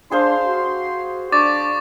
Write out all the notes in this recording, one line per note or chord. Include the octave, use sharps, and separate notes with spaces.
D4 G#4 C5 F5 C6
F#4
D4 D5 C#6 D6 A6